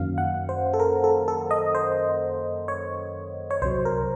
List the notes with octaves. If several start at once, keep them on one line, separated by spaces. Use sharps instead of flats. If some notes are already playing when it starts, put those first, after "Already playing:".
Already playing: F#2 D#3 F#3 A#3 C#4 F5
F#5
C5
A4
A#4
A4
A4
D#5
C5
C#5
C#5
C2 C3 F#3 C5
A#4